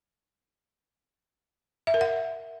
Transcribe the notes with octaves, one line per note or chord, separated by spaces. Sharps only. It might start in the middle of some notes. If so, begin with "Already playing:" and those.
E5
A#4
F#5